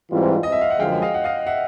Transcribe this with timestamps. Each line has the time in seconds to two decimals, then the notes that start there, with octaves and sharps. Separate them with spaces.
0.12 G#2 E3 G3 C4 F4
0.43 D#5
0.52 E5
0.61 F5
0.70 F#5
0.79 F#2 D3 F3 G#3 F5 G5
1.02 D#5 F5
1.14 F#5
1.24 D#5 F5
1.47 E5 F#5